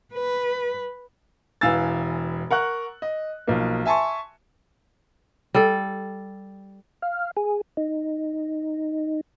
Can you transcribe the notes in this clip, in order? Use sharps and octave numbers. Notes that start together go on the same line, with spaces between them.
B4
E1 E3 F5 G#5 E6 A6
A#4 F#5 C#6 F#6
D#5
B1 F3 A#3
E5 G#5 A5 C6 C#6
G3 A4
F5
G#4
D#4